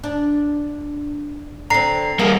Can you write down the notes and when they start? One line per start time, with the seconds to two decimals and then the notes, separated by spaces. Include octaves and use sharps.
0.04 D4
1.70 D3 C4 A#5 C7
2.19 G3 A#3 G#4